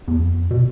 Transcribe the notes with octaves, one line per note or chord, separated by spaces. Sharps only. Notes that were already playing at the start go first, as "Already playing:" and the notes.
E2
F2
B2